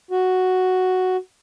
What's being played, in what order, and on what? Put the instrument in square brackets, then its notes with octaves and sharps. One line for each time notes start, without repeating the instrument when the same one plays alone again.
[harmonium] F#4